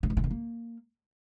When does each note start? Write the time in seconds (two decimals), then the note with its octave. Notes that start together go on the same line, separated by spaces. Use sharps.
0.03 A2
0.10 G2
0.17 B2
0.24 C3
0.30 A#3